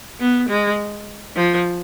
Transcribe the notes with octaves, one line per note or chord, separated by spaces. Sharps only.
B3
G#3
F3